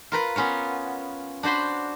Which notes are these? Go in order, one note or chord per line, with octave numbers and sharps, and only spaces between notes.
F4 A#4 B4
B3 C#4 F4 C#5
D4 F#4 C5 B5 C6